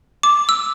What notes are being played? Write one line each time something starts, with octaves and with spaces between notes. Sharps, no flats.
D6
E6